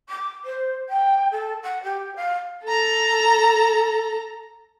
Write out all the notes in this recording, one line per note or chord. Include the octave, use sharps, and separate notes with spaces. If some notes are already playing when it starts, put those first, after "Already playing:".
D6
C5
G5
A4
F#5
G4
F5
A4 A#5